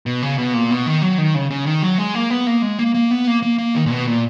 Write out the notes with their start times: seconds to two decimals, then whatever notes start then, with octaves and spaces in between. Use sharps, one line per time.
0.06 B2
0.22 C#3
0.38 B2
0.54 A#2
0.71 B2
0.86 D#3
1.02 F#3
1.18 D#3
1.35 C#3
1.51 C#3
1.66 D#3
1.82 F#3
1.98 G#3
2.15 A#3
2.30 B3
2.47 A#3
2.62 G#3
2.79 A#3
2.94 A#3
3.11 B3
3.27 A#3
3.42 A#3
3.58 A#3
3.75 D#3
3.86 A#2
3.91 B2
4.07 A#2